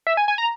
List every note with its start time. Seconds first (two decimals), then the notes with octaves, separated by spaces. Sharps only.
0.07 E5
0.17 G#5
0.28 G#5
0.38 A#5